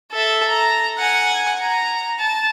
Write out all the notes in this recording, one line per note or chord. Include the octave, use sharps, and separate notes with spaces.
A4 E5
A#5
F#5 G#5
A#5
A5